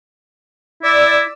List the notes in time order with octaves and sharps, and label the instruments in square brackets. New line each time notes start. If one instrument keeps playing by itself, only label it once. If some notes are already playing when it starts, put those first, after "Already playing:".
[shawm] E4 [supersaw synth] D5 E6